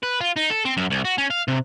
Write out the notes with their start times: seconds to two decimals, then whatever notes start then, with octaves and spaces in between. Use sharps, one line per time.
0.03 B4
0.21 F4
0.36 D#4
0.50 A4
0.65 C4
0.77 F#2
0.90 C2
1.05 F#4
1.18 C#4
1.30 F5
1.48 C3